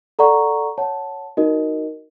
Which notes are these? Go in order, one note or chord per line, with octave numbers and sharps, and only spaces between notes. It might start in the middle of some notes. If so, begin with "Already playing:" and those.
A4 D5 F#5 A#5 C#6
C#5 F#5 A5
D#4 F#4 A#4 D#5